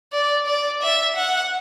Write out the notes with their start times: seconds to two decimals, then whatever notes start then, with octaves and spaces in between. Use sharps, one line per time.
0.12 D5
0.46 D5
0.82 E5
1.16 F#5